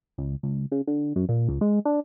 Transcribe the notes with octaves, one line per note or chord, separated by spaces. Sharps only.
C#2
C#2
C#3
D3
F#2
A#2
C#2
G#3
D4